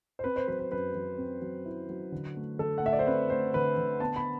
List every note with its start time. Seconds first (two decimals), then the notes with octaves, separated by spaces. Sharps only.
0.19 C5
0.24 C4 B4
0.36 C5
0.48 F#3 B4
0.59 B4
0.72 F#2 B4
0.95 F#3
1.18 C4
1.42 F#3
1.65 E4
1.89 F#3
2.12 D3
2.36 A3
2.59 D3 A4
2.78 F#5
2.83 A3 E5
2.93 D5
2.99 C5
3.07 C4 B4
3.30 A3 C5
3.54 D3 B4
3.77 D3
4.00 B3 A5
4.16 B5